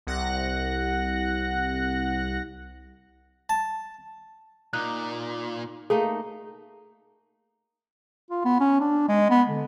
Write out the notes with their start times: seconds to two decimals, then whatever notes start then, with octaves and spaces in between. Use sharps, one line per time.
0.07 C2 F#5 F#6 A#6
3.49 A5
4.73 A#2 D#4 F#6
5.90 A3 A#3 D#4 G#4
8.30 F4
8.45 B3
8.60 C#4
8.80 D4
9.09 G#3
9.30 B3
9.49 D3